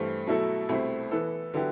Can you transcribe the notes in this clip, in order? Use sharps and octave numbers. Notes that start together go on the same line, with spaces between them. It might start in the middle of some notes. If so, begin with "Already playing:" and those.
Already playing: G2 E3 A3 C4
B2 F#3 A3 E4 A4
C2 B2 A3 C4 E4
E3 B3 E4 A4
D3 F#3 B3 E4 G4